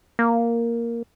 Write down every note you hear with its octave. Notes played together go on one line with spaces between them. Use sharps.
A#3